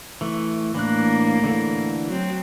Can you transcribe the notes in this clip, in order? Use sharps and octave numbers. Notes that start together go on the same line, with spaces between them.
E3 A3
A2 E3 A#3 D4 F#6
D3 E3 A4
F#3 C4